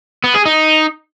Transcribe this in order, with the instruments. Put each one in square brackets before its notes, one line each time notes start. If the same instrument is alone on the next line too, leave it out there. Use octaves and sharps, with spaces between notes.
[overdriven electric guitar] B3
G#4
D#4